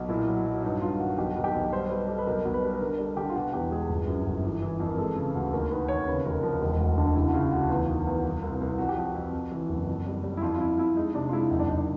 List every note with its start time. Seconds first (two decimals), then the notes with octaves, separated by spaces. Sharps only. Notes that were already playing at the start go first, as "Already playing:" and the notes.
Already playing: B1
0.09 A#2 E4
0.27 F#3
0.46 F#3
0.63 G2 D#4
0.82 G2 F4
1.00 D#3 F#4
1.18 B1 G4
1.31 F#4
1.37 B1
1.44 G4
1.55 B1
1.72 G3 C5
1.90 G3 B4
2.08 G3 A4
2.18 B4
2.27 B1 A#4
2.45 B1
2.54 B4
2.63 G3
2.73 B4
2.81 D3 A#4
2.98 G3 A4
3.17 D3 G4
3.29 F4
3.35 B2 F#4
3.53 E2 G4
3.71 G#3 G#4
3.90 G1
4.07 F#2
4.27 G1
4.44 E3
4.62 E3
4.80 F2
4.88 A#4
4.98 G#3 A4
5.16 C#3
5.35 D2
5.53 D#2 A#4
5.71 D#3 B4
5.88 D#2 C#5
6.07 C#3 B4
6.25 F1 A#4
6.43 F3 A#4
6.61 E1
6.80 D2
6.98 D3
7.15 C#3 E4
7.28 F#4
7.34 C#3 F4
7.52 D2 F#4
7.70 E2 F4
7.88 D#3
8.07 E2
8.24 C2
8.42 C2
8.61 C2
8.79 F2 F#4
8.89 G4
8.97 F3 F#4
9.15 F2
9.33 F2
9.52 E3
9.69 F#1
9.87 F2
10.07 G3
10.24 G3
10.37 E4
10.42 F2 F4
10.55 F4
10.60 F2 E4
10.78 F2 E4
10.96 G#3 D#4
11.14 C3 D4
11.29 F4
11.33 G#3 E4
11.51 F#1 D#4
11.60 D4
11.69 F#1 D#4
11.78 D4